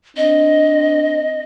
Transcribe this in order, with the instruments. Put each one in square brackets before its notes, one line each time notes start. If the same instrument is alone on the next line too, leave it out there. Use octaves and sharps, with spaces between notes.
[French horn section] C4 D4 [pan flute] D#5